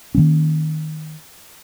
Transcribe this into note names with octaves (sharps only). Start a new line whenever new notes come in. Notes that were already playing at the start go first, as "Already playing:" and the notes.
D#3 F3 A#3 C#4